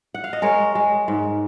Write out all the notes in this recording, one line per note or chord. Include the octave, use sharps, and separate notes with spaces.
F#5
F5
D#5
G#3 A#4 C#5
G#3
G#2